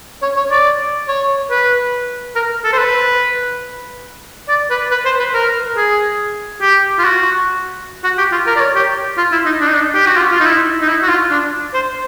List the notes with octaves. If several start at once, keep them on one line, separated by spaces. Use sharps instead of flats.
C#5
C#5
D5
C#5
B4
A#4
A4
C5
B4
D5
B4
B4
C5
B4
A#4
G#4
G4
F4
F#4
F#4
G4
F4
A#4
D5
C#5
G4
F4
E4
D#4
D4
D#4
D4
G4
F#4
F4
F4
D#4
E4
D#4
E4
F#4
F4
D4
C5